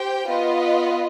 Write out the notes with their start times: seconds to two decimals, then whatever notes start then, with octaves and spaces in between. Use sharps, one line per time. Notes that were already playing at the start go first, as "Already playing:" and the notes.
Already playing: G4 C5 G5
0.26 B3 F4 B4 D#5